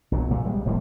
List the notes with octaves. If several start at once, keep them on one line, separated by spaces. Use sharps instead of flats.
B1 A#2 F#3
C#2 A#2 F#3 A3
G3 G#3
E1 A2 F3 A#3